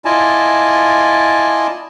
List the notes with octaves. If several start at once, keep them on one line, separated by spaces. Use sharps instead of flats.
E4 F4 D5 D#5 G#5 A5